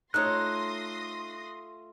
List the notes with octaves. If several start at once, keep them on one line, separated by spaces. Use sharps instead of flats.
A3 D#4 F4 C#5 C6 D#6 F#6 A#6